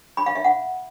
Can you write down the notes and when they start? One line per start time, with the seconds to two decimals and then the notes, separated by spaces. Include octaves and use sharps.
0.17 B5
0.26 F5
0.35 E5
0.44 F#5